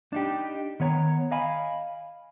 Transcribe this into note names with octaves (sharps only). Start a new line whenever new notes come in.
D4 D#4 G4
D#3 B3 C#5 A#5
D#5 F5 G#5 B5